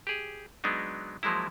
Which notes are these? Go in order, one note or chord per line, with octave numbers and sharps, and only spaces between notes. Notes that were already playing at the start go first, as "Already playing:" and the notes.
G4 G#4
F#3 G#3 B3 D4 D#4
F3 F#3 G#3 A#3 E4